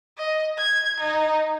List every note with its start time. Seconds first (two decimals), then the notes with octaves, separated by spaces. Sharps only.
0.18 D#5
0.58 G#6
1.00 D#4